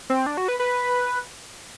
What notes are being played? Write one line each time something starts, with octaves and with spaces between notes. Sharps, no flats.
C4
D4
F#4
B4
B4